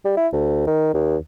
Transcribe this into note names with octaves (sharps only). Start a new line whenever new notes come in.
G3
E4
D2
D#3
D#2